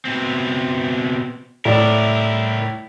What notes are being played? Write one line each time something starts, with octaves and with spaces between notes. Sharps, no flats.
B2 C4
A2 E4 A#4 D5